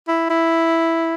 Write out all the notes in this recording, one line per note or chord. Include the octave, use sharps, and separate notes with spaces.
E4
E4